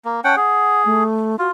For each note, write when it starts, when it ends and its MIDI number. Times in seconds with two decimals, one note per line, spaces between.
0.05 0.20 58
0.24 0.36 61
0.24 0.36 78
0.24 0.36 79
0.24 0.36 81
0.37 1.04 68
0.37 0.82 78
0.85 1.36 57
1.39 1.51 65
1.39 1.48 66